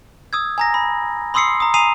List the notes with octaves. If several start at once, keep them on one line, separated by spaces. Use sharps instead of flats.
D#6 E6 G#6
G#5 A#5 A#6
B5
B5 C6 D#6 E6 C7 C#7
A#5 D#6
G#5 A#5 D#6 C7 D#7 F7